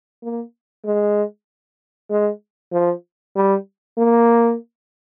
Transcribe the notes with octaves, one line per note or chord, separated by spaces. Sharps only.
A#3
G#3
G#3
F3
G3
A#3